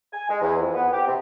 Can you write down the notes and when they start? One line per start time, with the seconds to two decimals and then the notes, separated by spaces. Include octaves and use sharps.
0.12 G#5
0.29 G#3
0.41 E2
0.60 F2
0.75 B3
0.93 G4
1.07 C3